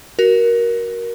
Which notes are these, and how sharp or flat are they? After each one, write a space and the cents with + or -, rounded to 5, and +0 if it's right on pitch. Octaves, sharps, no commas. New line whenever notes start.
F#4 +15 A#4 +15